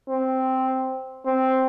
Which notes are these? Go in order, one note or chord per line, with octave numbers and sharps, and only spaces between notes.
C4
C4